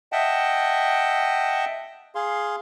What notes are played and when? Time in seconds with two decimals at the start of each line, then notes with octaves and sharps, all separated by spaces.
0.12 D#5 E5 F#5 G5 A5
2.15 G#4 F5 C6